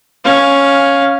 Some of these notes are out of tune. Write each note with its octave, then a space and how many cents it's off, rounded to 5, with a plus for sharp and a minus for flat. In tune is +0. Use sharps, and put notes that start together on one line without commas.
C#4 +0 F5 +5